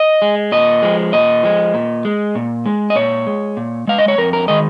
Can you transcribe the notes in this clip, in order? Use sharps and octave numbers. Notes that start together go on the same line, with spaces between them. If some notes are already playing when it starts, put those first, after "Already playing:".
Already playing: D#5
G#3
A#2 D#5
F3 G#3
A#2 D#5
F3 G#3
A#2
G#3
A#2
G#3
D#5
A#2 C#5
G#3
A#2
G#3 F5
D#5
C#5
F2 A#4
A#4
D#3 G#3 D#5